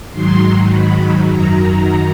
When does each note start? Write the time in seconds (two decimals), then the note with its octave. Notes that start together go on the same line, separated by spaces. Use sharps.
0.11 G#2 D#3 F#3 C6
0.70 B5
1.29 F#2 D#3 F#3 A#5